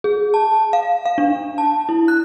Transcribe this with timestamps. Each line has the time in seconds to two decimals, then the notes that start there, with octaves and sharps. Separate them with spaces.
0.04 G#4
0.34 A5
0.73 F5
1.06 F5
1.18 D4
1.58 A5
1.89 E4
2.08 F#6